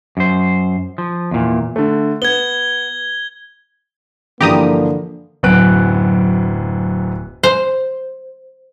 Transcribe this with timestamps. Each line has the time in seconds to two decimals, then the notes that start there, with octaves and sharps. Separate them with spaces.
0.17 F#2 C5
0.98 F3
1.31 E2 A#2
1.76 D3 A3
2.22 B3 G#6 G7
4.41 G2 D3 E3 F3 A#3 G4 A#5 D#6
5.43 D1 F#2 B3 F#6 D7
7.43 C5